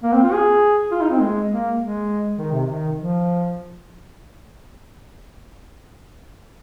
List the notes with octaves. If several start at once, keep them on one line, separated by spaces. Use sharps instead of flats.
A#3
C4
F4
G#4
F4
D#4
C4
G#3
A#3
G#3
D#3
C3
D#3
F3